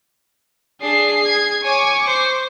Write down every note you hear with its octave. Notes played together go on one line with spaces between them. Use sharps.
D4 G#4 C7
G#6
C#5 G#5 C#6 D6
C5